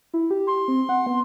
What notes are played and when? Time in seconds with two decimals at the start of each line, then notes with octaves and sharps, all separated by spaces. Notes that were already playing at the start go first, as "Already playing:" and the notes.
0.14 E4
0.31 G4
0.47 C6
0.68 C4
0.89 F#5
1.06 B3